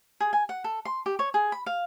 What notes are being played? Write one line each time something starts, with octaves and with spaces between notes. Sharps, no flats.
G#4
G#5
F#5
A4
C6
G4
C#5
G#4
B5
F5